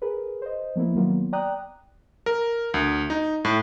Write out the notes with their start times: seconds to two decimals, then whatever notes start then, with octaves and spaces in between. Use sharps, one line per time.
0.02 G#4 A#4 B4
0.42 C5 D#5
0.76 F3 A#3 B3 E4
0.95 D#3 F#3 A#3 B3 F4
1.33 D5 G5 A#5 D#6 F#6
2.26 A#4
2.74 D2
3.10 D#4
3.45 A2